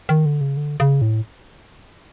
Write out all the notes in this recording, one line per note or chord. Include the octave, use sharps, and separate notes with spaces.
D#3
D3
C#3
D3
C#3
A2